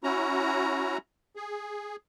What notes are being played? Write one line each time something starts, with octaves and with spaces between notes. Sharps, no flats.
C#4 E4 F#4 A#5
G#4